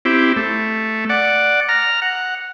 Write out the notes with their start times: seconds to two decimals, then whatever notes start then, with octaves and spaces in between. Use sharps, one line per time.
0.05 C4 E4 G4
0.37 A3
1.09 D5 F#5
1.69 A#5 F6
2.02 F#5